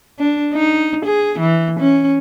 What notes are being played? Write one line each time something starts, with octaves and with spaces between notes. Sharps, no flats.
D4
D#4
G#4
E3
C#4